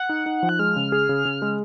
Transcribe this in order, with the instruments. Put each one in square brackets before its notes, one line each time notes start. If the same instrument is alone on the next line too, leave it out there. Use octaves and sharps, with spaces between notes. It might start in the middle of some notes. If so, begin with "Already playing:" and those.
Already playing: [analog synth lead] F#5
[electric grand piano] D#4
D#4
F3
[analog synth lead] F#6
[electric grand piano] G#3 [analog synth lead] F6
[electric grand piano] C#3
G#4
C#3
C#3
G#3